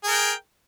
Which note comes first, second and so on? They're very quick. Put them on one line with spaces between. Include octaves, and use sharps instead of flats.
G#4 A#4 G5